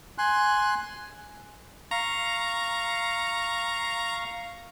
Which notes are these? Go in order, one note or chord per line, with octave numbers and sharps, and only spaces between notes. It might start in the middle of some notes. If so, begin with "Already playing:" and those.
G#5 C6 F#6
F5 A#5 C#6